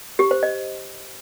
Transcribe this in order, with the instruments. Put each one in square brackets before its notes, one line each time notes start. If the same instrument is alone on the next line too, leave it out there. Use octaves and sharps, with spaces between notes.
[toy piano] G4
C5
D#5